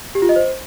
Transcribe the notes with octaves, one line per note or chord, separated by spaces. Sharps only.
G4
F4
D#5
C5